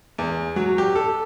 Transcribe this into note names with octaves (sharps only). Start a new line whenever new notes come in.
E2
F#3
G4
A4